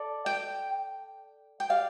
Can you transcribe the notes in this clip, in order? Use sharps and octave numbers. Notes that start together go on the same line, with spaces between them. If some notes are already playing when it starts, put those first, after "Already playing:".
Already playing: A4 D5
G5
G5
G4 D5 F5